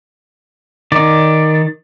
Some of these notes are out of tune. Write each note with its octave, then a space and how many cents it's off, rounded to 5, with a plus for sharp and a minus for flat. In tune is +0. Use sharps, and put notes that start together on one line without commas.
D#3 +0 D5 +10